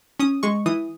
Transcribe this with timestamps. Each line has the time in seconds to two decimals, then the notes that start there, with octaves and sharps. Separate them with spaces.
0.20 C#4 D#6
0.43 G#3 C#6
0.66 E3 D#6